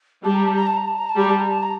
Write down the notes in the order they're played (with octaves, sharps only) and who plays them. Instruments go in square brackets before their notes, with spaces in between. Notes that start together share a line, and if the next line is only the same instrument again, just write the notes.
[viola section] G3 [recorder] A5
[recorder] A#5
A5
A#5
A5
A#5
A5
A#5
A5
[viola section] G3 [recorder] A#5
[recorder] A5
A#5
A5
A#5